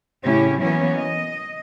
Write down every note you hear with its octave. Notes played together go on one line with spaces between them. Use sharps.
A2 C#3 C#4 E4 G4
E3 F#3 A#3 B3 C#4 E4
D#5